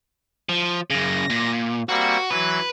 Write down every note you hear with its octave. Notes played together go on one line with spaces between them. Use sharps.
F3
F#2 C#3 A#6
A#2
G3 A#3 C4 F#4
E3 F#3 B4